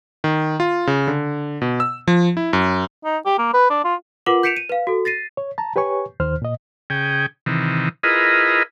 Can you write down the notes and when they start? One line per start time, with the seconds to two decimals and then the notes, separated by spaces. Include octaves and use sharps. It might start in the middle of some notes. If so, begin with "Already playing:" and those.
0.24 D#3
0.60 F4
0.87 C#3
1.08 D3
1.62 B2
1.80 E6
2.08 F3
2.37 E4
2.53 F#2
3.05 D#4
3.26 G4
3.38 A#3
3.54 B4
3.70 D4
3.84 F4
4.26 F4 A#4 B4 F#5 D6 F#7
4.43 G6 B6 C#7 D7 E7 F7
4.57 D#7
4.70 B4 F5
4.87 F#4 A4
5.05 A6 A#6 C7 D#7
5.37 C#5
5.58 A5 A#5
5.76 G4 B4 C#5 G#5 C#6
6.20 D#2 D#3 C5 F6
6.42 A#2 D#5
6.90 C#3 G#4 G5
7.46 C3 D#3 E3
8.03 E4 F4 G#4 A#4 B4 D#5